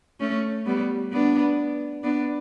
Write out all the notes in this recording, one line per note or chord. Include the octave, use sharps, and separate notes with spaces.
A3 C#4
G3 B3
B3 D4
B3 D4